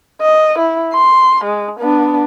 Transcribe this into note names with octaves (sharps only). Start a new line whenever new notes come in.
D#5
E4
C6
G#3
B3 D4